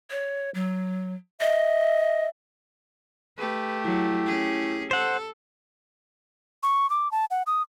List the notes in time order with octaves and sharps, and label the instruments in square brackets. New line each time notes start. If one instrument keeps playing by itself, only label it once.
[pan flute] C#5
F#3
[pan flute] D#5 [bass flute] E5
[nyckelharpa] A3 G4 [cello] B4
[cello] F#3 [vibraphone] E4
[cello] C#4 G#4
[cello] A4 [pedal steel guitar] C5 F#5
[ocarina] C#6
D6
A5
F#5
D#6